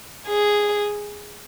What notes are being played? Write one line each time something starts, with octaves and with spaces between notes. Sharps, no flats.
G#4